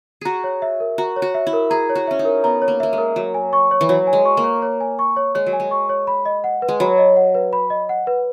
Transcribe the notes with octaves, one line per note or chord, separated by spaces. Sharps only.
F#4 G#4 A#5
C#5
E5
A#4
F#4 A#5
C#5
F#4
E5
E4
A#4
G#4 A#5
C#5
F#4
C#4 E5
D#4
A#4
B3 A#5
C#5
A#3
A#3 E5
G#3
A#4
F#3 C#5
G#5
C#6
C#5
E3
F#3 C#5
G#5
G#3
C#6
A#3
C#5
C#5
G#5
C#6
C#5
G#3 C#5
F#3
G#5
G#3
C#6
C#5
B5
D#5
F#5
B4
G#3
F#3 B5
D#5
F#5
B4
B5
D#5
F#5
B4